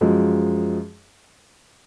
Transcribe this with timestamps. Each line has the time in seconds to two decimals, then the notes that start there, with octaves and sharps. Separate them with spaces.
0.01 F#2 F3 G#3